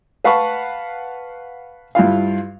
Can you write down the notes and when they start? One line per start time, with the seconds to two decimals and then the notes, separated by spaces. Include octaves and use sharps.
0.24 B4 F5 F#5 A5 B5 C#6
1.95 G2 E4 F4 F5